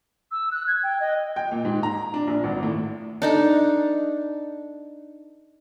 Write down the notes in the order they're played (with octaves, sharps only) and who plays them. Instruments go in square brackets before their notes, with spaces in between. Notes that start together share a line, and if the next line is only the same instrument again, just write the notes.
[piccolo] E6
F#6
G#6
G5
D#5
[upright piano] G5
A#2
G#2
A#5
D4
A#1
G#1
A2
[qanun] D4 D#4 A4